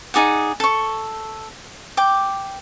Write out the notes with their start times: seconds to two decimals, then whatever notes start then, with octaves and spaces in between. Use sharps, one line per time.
0.14 D#4 G#4 D5 F#5
0.60 A4 C#6
1.97 G5 D6